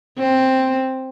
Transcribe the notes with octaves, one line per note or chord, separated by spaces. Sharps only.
C4